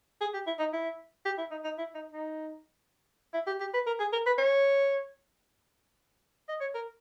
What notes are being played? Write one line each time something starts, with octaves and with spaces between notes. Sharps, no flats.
G#4
G4
E4
D#4
E4
G4
E4
D#4
D#4
E4
D#4
D#4
E4
G4
G4
B4
A#4
G#4
A#4
B4
C#5
D#5
C#5
A#4